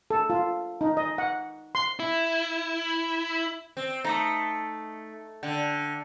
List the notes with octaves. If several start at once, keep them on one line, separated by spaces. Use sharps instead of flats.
A4
F4
D#4
D#5
F#5
C6
E4
C4
A3 D#4 A#5 D#6
D3 G5